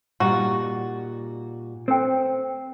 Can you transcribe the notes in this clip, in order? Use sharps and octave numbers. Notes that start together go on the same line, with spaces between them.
A#2 G3 D#4 F#4
C4 A4 C5 G5